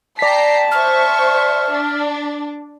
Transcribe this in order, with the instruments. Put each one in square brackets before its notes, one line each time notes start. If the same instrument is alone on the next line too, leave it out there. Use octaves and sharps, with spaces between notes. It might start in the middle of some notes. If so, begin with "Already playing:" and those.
[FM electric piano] D5 B6 [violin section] G5 A#5 C7 [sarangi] A5
[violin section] C5 E5 C#6 [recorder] F6
[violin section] D4